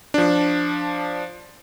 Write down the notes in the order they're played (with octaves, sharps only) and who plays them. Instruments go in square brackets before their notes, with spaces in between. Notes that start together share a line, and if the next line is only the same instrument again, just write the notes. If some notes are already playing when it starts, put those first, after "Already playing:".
[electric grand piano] F3 D4